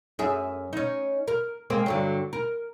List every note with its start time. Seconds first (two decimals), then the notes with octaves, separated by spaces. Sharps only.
0.19 F#2 G#4 E5
0.73 C#4 D#4
1.28 A#4
1.70 G#3 A#3 C4
1.86 G2 D3 F#3
2.33 A#4